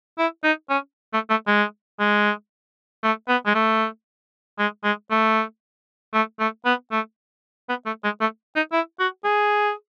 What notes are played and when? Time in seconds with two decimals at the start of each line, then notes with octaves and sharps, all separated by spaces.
0.19 E4
0.44 D#4
0.70 C#4
1.14 A3
1.30 A3
1.47 G#3
2.00 G#3
3.04 A3
3.28 B3
3.46 G#3
3.55 A3
4.59 G#3
4.84 G#3
5.11 A3
6.14 A3
6.40 A3
6.66 B3
6.92 A3
7.69 B3
7.86 A3
8.04 G#3
8.21 A3
8.56 D#4
8.73 E4
9.00 F#4
9.25 G#4